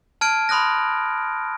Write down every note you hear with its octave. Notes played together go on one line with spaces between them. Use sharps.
A5 F6 G#6 D7
B5 C6 D#6 F#6 A#6